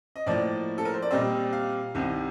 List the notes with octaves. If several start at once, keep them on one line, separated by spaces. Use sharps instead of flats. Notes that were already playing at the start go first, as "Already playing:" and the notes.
D#5
A2 F3 A#3 D5
A4
A#4
C5
D5
A#2 G3 C4 D#5
F5
C2 C3 D#3